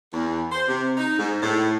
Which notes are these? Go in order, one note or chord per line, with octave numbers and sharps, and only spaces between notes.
E2
C5
C3
D#4
G#2
A2